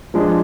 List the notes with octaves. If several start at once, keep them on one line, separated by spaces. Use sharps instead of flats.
F3 G#3 D4